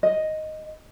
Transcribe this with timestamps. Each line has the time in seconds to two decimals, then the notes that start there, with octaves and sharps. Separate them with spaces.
0.03 D#5